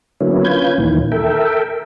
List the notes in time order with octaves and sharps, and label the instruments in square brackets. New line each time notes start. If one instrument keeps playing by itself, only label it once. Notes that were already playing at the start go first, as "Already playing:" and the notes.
[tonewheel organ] D3 F#3 A#3 B3 C#4 E4
C#4 F4 B4 G6 G#6
D#2 A#2 D#3 E3
A4 A#4 E5 G5